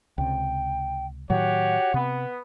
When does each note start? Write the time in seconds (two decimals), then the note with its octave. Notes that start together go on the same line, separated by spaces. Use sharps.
0.18 C#2 C3 G5
1.30 A2 D#3 F#3 F#4 G4 C#5 F#5
1.94 C3 B3